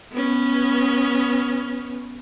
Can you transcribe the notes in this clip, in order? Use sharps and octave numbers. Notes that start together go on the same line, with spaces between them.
B3 C#4